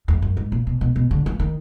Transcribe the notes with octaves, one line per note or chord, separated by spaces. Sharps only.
F2
F#2
G#2
A#2
B2
B2
B2
D3
F3
D#3